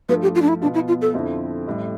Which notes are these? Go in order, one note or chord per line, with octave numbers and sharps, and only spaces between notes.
G2 F3 A3 B4
G4
F4
D4
E4
B2 B3 D4 F4
E4
F4
A4
F2 D3 F3 C4 E4
A1 A2 G3